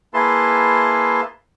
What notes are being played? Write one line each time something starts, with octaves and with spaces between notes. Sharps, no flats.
A#3 E4 G#4 B4 A5 C6